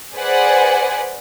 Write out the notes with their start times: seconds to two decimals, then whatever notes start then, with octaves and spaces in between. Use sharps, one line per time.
0.14 G#4 B4 C5 D5 F#5 G#5